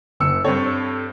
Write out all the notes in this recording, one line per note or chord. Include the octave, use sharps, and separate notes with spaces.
F#1 E6 C#7
G2 C4 A4 C#5